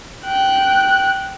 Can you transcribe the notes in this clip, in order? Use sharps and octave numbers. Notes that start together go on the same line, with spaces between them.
G5 F#6